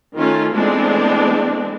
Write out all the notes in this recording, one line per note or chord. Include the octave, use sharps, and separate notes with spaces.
D#3 A3 C#4 F4
E3 G#3 A3 B3 C4 D4